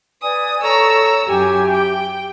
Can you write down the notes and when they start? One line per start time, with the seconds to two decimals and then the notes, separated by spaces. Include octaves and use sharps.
0.22 B4 D5 G#5 D#6
0.62 A4 C#5 A#5 C#6 E6
1.27 F#2 E4 G4 G#5
1.72 G5